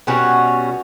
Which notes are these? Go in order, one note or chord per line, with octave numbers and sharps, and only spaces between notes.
B2 G3 C#4 F#4